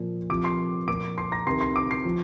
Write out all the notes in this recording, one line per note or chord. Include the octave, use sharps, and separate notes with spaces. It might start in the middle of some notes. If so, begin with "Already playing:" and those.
Already playing: A#2 F3
C3 F3 D6 D7
C6 C7
A#2 F3 D6 D7
C6 C7
A#5 A#6
C3 D#3 C6 C7
C6 C7
D6 D7
C6 C7
F3